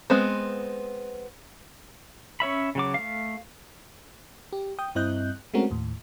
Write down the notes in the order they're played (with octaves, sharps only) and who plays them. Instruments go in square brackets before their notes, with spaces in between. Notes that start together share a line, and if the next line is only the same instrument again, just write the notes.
[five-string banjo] G#3 B3 C4
[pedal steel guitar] C#4 C#5 E5 B5
C#3 F#3 D6
A3 F5
[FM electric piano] G4
G5 D#6 G6
G2 C4 E4 D#5 F#6 G6
G#3 A3 C4 C#4 F#4 A#4
D#2 A2